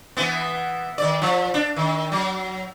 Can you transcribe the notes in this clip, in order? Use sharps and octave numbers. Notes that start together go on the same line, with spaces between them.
E3 B3
D#3 D5
F3
D4
D#3
F#3